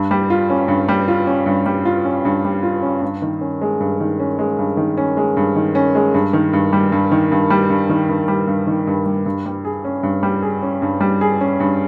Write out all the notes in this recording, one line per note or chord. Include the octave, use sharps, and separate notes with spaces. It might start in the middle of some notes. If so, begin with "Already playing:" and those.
Already playing: G2
G3
F4
C#4
G2
G3
F4
C#4
G2
G3
F4
C#4
G2
G3
F4
C#4
G2
D#3
C#4
G#3
G2
D#3
C#4
G#3
G2
D#3
C#4
G#3
G2
D#3
C#4
G#3
G2
D#3
G2
G3
G2
D#3
G2
G3
G2
D#3
G2
G3
G2
D#3
G2
G3
G2
G3
G#4
C#4
G2
G3
G#4
C#4
G2
G3
G#4
C#4
G2